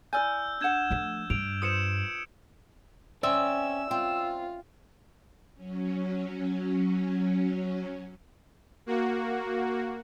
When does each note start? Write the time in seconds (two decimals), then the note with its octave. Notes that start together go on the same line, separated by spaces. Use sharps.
0.13 E4 D5 G#5 E6 F6 G6
0.61 D4 F#5 G6 G#6 E7
0.90 F3 A3
1.30 G2 E6 D7 F7
1.62 F4 B4 C5 D#6 C#7 E7
3.23 C4 C#4 D5 E5 E6
3.91 C4 F4
5.55 F#3 C#4
8.86 A#3 F#4